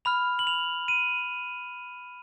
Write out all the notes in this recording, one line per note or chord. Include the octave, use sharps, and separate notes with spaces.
B5 F6 F7
F#7
F7
D#7